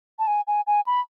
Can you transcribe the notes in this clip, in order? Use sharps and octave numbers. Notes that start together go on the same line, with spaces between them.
A5
G#5
G#5
G#5
B5